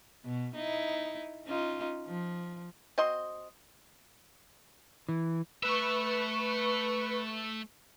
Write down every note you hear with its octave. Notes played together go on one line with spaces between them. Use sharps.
B2
D#4 E4
C#4 D#4 F4
F3
C4 F#4 D#5 C6
E3
A3 B4 E5 C#6